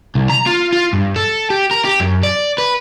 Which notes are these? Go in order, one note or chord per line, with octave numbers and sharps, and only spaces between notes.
C2
A#5
F4
F4
G2
A4
G4
A#4
G4
F#2
D5
B4